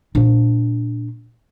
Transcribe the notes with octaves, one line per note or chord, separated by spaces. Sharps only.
A#2 D4